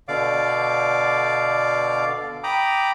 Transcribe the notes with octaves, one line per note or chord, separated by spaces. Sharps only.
B2 D3 D5 F5 D6
G5 A#5 B5 D6 D#6